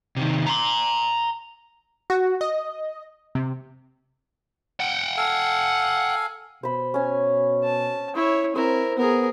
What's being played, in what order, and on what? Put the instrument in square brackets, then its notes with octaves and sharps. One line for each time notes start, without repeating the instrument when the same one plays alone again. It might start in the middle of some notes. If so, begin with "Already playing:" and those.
[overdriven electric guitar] C3 D#3
A#5 C6
[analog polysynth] F#4
D#5
C3
[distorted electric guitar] F#5 G5
[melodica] A4 F5 G#5
[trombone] B2 [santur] C5 B5
[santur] C#4 G#5
[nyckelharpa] A5
E4 C#5
[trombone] C4 [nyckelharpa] E4 A#4 [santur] C5
[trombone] B3 [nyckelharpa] G#4 A#4